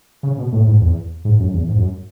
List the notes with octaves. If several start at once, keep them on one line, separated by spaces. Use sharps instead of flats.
C#3
B2
A2
G#2
E2
G#2
F#2
E2
G#2
F#2